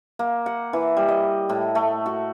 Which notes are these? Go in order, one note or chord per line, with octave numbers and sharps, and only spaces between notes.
A#3
F#5
E3
G3
D#5
A2
A3
F#4